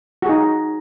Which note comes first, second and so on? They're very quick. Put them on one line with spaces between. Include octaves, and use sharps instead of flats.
F#4 G#4 D#4